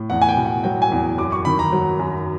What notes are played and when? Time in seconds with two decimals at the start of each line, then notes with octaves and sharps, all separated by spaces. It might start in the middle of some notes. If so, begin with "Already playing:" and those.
Already playing: A2
0.10 E2 F#5
0.22 G#5
0.29 G5
0.37 B2
0.46 F#5
0.64 F#3 G5
0.82 G#5
0.92 E2
1.18 F#2 D6
1.32 C#6
1.45 D#3 B5
1.59 A#5
1.73 F#3
2.00 F#2